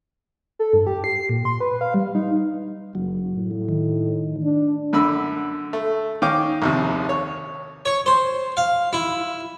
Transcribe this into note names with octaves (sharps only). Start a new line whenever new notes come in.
A4
G2
G4
C7
A#2
C6
B4
F5
G3
D#4
F#1 F#3
A2
D#3
D4
F#2 D3 B5 E6
A3
D#3 C#4 F5 G5 D6
A#1 D#2 C3
C#5
C#5
C5
F5
E4